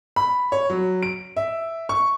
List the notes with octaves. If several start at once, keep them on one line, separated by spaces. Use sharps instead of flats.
B5
C#5
F#3
D7
E5
C#6